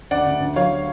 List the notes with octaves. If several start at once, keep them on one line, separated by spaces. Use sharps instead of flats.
D2 D5 F#5
D2
D2
F#3 C#5 F5